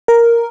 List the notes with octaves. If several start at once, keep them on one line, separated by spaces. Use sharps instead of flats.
A#4